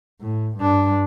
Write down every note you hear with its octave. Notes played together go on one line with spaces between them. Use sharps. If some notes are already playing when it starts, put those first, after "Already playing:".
A2
G2 D4